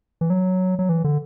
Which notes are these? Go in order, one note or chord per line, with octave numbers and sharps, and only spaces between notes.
E3
F#3
F#3
E3
D3